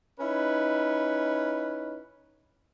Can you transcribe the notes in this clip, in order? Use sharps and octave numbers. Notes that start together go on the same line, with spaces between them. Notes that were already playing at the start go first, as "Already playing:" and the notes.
C#4 D#4 E4 B4